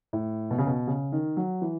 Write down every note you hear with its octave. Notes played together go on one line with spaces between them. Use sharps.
A2
B2
C#3
B2
C#3
D#3
F#3
E3